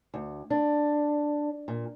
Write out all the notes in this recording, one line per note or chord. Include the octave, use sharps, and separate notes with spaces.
D2
D4
A#2